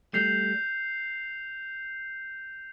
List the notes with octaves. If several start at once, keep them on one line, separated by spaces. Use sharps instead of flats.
G3 A3 G6 C7 F7